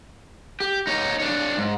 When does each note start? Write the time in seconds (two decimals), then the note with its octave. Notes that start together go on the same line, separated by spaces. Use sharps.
0.60 G4
0.87 D#4 C#5
1.20 D4 C#5
1.57 G#2